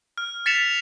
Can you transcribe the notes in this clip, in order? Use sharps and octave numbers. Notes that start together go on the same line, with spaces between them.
F6
A6 B6 C#7 E7 F7